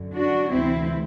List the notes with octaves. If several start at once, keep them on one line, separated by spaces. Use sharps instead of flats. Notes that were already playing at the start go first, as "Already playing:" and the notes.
Already playing: F#2 D3
D4 F#4
D2 C3 E3 C4 E4